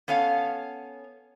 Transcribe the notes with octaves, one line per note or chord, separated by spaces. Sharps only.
B3 C#4 A4 F5